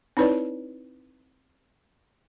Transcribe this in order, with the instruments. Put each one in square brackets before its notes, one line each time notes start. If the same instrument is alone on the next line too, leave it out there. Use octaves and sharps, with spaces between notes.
[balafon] C4 D#4 E4 B4 C#5 D5